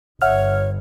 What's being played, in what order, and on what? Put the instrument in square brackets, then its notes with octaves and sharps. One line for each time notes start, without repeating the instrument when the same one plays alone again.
[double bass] G1 [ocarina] C#5 [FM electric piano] E5 F#5 F6